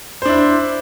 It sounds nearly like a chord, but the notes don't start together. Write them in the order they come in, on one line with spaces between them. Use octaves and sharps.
C5 D4 E4